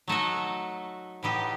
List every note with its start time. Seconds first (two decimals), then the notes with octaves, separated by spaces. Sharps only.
0.08 F#3 A3 D#4 F#4 A4
1.23 A2 E3 B3 D#4 G4